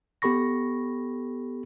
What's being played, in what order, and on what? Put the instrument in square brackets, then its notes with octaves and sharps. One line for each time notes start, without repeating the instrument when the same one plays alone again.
[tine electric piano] B3 G4 A4 B5 C#6 A#6